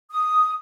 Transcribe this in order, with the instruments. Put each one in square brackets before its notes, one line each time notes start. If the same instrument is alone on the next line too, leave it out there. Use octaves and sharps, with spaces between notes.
[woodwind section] D#6